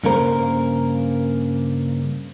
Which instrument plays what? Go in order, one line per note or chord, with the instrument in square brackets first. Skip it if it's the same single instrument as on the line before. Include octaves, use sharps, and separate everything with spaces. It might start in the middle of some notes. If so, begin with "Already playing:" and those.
[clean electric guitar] G2 C#3 A#3 A#4 C5